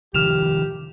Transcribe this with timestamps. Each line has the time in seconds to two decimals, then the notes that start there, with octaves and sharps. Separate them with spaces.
0.14 C3 D#3 F3 G4 F6 E7 F7